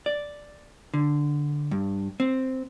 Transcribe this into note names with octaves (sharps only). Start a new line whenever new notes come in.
D5
D3
G2
C4